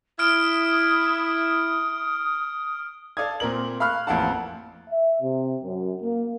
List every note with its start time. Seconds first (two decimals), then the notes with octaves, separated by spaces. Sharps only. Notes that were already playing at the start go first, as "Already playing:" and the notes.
0.19 E4 D#6 F6 D7
3.17 A4 D5 F5 D#6 G#6
3.40 A#2 C4 A#4 F#7
3.80 F5 B5 C#6 F6 F#6
4.07 A1 F2 A#3 F5 F#5 A5
4.89 E5
5.22 C3
5.63 F#2
6.02 A#3